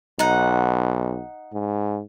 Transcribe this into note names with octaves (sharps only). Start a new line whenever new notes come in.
B1 D#4 F#5
G#2